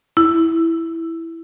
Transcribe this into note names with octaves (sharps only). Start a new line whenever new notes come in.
E4